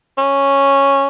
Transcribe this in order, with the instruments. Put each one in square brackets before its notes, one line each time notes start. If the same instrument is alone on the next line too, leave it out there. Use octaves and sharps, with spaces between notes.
[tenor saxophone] C#4